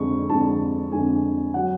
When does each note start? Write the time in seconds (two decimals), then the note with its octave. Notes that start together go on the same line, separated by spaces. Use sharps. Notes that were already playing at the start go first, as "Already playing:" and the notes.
Already playing: F2 D3 G#3 C#6
0.29 F2 D3 G#3 A5
0.91 F2 D3 G#3 G#5
1.54 F#3 F#5